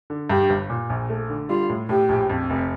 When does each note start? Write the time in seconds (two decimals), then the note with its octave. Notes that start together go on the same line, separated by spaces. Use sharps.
0.10 D3
0.30 G2 G4
0.50 G1
0.70 A#2
0.90 A#1
1.09 A3
1.30 D3
1.49 G3 F4
1.69 A2
1.89 A2 G4
2.09 A#1
2.30 F2
2.50 F1